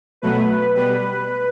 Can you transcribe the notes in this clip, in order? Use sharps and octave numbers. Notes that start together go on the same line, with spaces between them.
B2 F#3 A3 B4
B2 G3 B4